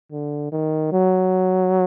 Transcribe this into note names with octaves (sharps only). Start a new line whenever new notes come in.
D3
D#3
F#3